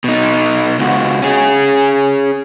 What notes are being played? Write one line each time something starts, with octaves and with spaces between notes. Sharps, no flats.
B2 D#4
C#2 F#4
C#4 G#4